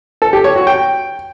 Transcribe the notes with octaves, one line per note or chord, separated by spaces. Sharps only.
A4
G4
C#5
F#4
G5